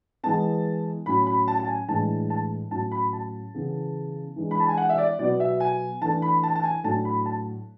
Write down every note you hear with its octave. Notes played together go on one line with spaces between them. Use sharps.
E3 G#3 B3 A5
A2 F#3 C#4 B5
B5
A5
A5
G#5
A2 E3 G#3 D4 A5
A5
A2 F#3 C#4 A5
B5
A5
C#3 E3 B3
E3 G#3 D4
B5
A5
G#5
F#5
E5
D5
B2 F#3 B3 D5
E5
G#5
E3 A3 D4 A5
B5
A5
A5
G#5
A2 F#3 A3 D4 A5
B5
A5